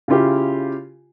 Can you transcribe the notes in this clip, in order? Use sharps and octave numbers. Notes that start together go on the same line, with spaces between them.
C#3 E4 F4 G4